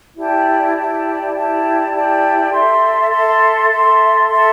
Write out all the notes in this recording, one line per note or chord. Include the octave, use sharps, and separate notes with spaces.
E4 G4 D5 A5
E4 G4 D5 A5
E4 G4 D5 A5
E4 G4 D5 A5
A4 E5 C6
A4 E5 C6
A4 E5 C6
A4 E5 C6